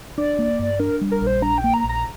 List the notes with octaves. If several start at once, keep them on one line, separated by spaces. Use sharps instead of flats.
D4 D5
A#3
G2
D4 A#4
G3
A#4
A#1 C5
D4 A#5
G5
A#3
A#5
A#1
A#5